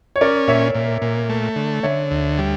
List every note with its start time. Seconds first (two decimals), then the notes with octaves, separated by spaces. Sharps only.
0.16 C#5
0.21 C#4 A#4 D5
0.48 A#2 C#5 E5
0.75 A#2
1.02 A#2
1.30 A3
1.56 D3
1.83 D3 C#5 E5
2.11 D2
2.38 G3